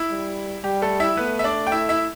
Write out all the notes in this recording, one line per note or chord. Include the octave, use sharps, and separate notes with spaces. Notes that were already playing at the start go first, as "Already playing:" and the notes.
Already playing: E4
G3
G3 G4
A3 A4
E4 E5
A3 B3 B4
E5
D4 D5
G5
E4 E5
E4 E5